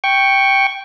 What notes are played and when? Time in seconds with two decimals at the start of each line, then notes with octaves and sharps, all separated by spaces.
0.04 G5 C#6